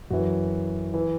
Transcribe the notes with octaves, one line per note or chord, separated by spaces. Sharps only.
F#2 E3 F#4
E3